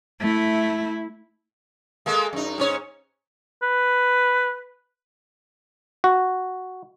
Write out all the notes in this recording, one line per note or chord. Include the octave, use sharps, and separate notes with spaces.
A3 E4
G#3 A#3 A4
F#2 D#4
G#2 C#4 C#5
B4
F#4